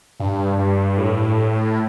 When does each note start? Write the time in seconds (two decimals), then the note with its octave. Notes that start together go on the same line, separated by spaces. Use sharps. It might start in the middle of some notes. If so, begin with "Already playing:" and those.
0.20 G2
0.59 G2
0.98 A2